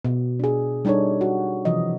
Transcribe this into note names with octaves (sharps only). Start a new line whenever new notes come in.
B2
D4 G#4
G3 D4 D#4 A4 C#5
F#4
C3 E3 F3 D#5